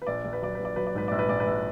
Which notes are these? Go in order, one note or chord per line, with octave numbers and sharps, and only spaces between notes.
B4
A#1 D5
A#1
B4
F#3 D5
A#1 B4
D5
F#3 B4
D5
G#2 B4
A#1 D5
B4
A#1 D5
B4
A#1